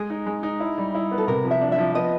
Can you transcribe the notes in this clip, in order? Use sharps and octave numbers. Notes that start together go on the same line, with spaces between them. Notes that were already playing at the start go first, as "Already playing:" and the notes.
Already playing: G#3 G#4
D#4
G#3
D#4
E4
G3
E4
B3
A4
C3 A#4
F3
E5
D4
E5
F3
B3 D#5